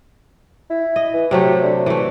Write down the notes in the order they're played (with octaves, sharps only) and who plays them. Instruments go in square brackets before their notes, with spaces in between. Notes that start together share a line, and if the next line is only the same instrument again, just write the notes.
[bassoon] E4
[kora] D#5
[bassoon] E3
[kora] C3 F#3 A3 [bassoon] G4
[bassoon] D3
[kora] E3 A3